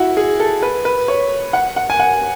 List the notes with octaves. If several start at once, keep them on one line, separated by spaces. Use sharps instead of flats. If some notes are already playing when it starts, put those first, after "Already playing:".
Already playing: E4 F#4
G#4
A4
B4
B4
C#5
F#5
F#5
G#5
F#5